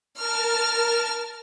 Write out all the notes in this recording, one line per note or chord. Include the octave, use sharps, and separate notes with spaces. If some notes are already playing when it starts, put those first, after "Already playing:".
A#4 A5 F6